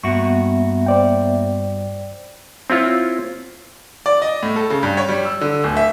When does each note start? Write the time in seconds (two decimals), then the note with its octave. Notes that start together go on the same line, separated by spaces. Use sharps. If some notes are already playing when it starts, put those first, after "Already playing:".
0.03 G2 A#3 B3 F#4 E5 C#6
0.86 C5 D5 G5
2.70 C4 E4 F4 C#5
4.06 D5
4.22 D#5
4.43 A2
4.56 A4
4.70 C#3
4.83 G2
4.97 C#5
5.09 G3
5.25 E6
5.41 D3
5.64 D1
5.77 E5